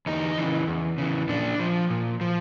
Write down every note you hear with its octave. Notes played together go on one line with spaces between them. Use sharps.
E2 D#4
C#3 E3
E2
C#3 E3
A#2 D4
F3
A#2
F3